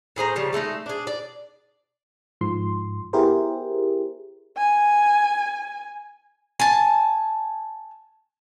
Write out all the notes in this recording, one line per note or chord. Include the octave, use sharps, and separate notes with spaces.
A2 G#4 C5 A#5
C#3 F3 G3
G#3 A3 C#4 D#4
D4 G#4
D5
G#2 F3 C6
B3 E4 G4 G#4 A#4 C5
G#5
G#5 A5